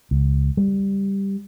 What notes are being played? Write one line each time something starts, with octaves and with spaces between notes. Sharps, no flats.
C#2
G3